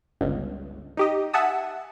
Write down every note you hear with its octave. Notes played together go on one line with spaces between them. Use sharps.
G1 C#2
D#4 G4 D#5
E5 F#5 G#5 A5 D#6 E6